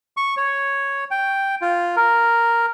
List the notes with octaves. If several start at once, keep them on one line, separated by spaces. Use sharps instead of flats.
C#6
C#5
G5
F4
A#4